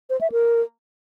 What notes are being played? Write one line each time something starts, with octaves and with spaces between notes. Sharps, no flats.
C5
E5
A#4